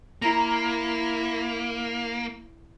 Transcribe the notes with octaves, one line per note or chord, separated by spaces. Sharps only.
A#3 E4 A#5